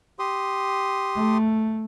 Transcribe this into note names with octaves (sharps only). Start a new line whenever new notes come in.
G4 C6 D#6
A3